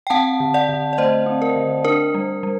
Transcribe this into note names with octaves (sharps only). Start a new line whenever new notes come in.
G5
C4 F#5 A5
D3
D5 F#5
D3
D5
A3 C5 D#5
C4
A#4
D3
D4 A#4
G3
G3